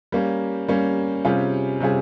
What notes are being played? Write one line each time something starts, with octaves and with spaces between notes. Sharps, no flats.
G3 A#3 C#4
G3 A#3 C#4
C3 G3 C#4 F4 G#4
C3 G3 C#4 F4 G#4